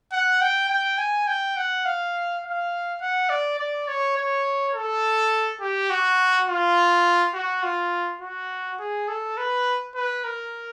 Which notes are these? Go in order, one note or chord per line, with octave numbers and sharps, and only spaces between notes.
F#5
G5
G5
G#5
G5
F#5
F5
F5
F#5
D5
D5
C#5
C#5
A4
G4
F#4
F4
F#4
F4
F#4
G#4
A4
B4
B4
A#4